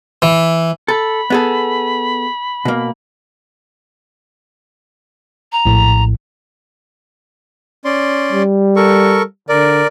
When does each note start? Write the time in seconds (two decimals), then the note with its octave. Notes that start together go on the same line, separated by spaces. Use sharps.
0.22 E3
0.88 A4 B5
1.30 B3 G#4 A4
2.65 B2 A#3
5.52 A#5
5.66 A#1 A2
7.85 C#4 D5 C6
8.33 G3
8.76 A4 A#4 C#6
9.49 D3 A#4 D5